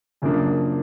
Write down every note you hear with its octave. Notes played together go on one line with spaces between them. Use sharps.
F#2 C#3 F3 A#3 D4